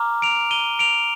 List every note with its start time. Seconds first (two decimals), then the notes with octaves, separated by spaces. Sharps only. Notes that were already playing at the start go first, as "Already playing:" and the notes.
Already playing: A#5 D6 F6
0.22 D7 F7
0.51 D#7 G7
0.79 D7 F7